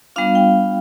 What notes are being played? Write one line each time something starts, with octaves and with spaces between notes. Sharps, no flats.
G3 B3 D4 F4 F5
G5